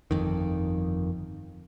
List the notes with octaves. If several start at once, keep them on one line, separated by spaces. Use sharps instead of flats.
G1 F2 D#3